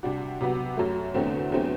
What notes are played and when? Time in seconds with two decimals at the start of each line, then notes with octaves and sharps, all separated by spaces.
0.03 C3 G3 D4 F#4
0.41 C3 F#3 B3 F#4
0.77 F#2 F#3 A3
1.14 E2 D3 A3 C4 F#4
1.52 E2 D3 F#3 A3 C4